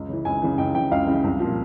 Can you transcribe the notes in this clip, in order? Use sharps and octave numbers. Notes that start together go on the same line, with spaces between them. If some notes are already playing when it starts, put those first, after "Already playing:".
Already playing: C#2
C#3 E3
C#2 G#5
C#3 E3
C#2 G5
C#3 E3 G5
C#2 F5
C#3 E3
C2
A#2 F3